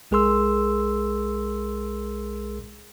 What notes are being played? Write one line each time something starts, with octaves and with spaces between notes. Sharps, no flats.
B1 G#3 G#4 A#4 C6 E6